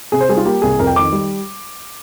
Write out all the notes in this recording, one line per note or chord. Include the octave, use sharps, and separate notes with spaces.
C3 G#4
C5
G3 G#4
F4
A#3 G4
C2 G#4
F2 A#4
G5
D#3 D6
G3